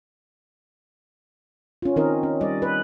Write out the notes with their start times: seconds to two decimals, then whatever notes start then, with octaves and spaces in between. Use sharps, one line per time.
1.82 C#4 F4
1.96 D#3 C4 C#4 D#4 A#4 D#5
2.23 C#4
2.41 G3 D5 D#5
2.62 B4